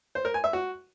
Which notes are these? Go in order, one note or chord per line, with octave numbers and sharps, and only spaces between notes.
C5
A#4
G#5
E5
F#4